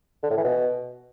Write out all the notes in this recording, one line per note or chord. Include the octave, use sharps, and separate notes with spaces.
D3
A2
E3
B2